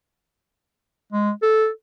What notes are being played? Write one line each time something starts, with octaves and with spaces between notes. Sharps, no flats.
G#3
A4